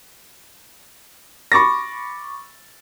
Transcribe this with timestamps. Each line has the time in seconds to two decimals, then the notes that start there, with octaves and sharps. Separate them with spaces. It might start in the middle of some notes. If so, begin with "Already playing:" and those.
1.52 B5 C#6 D6 A6 A#6